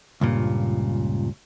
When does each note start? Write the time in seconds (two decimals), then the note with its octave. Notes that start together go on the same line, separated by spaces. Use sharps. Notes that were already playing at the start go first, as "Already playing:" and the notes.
0.21 C#2 G2 A#2